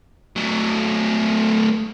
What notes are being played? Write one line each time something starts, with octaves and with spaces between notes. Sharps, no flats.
F#3 A3